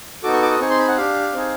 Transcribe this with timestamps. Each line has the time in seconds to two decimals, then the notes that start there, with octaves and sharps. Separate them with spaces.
0.23 B3 D#4 F#4 A4 D6
0.33 C#6
0.42 D6
0.51 D#6
0.60 C4 D#4 G#4 C#6
0.70 C6
0.79 B5
0.88 F#5
0.97 D4 G4 F5
1.34 C4 D#4 G#4